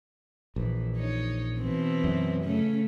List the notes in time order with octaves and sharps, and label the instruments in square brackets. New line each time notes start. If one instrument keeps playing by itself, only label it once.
[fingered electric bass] A#1 [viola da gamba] E3
[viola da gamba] D#4 C#5
B2 E3 C4
[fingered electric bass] F#2
[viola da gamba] C#3 A3 C#4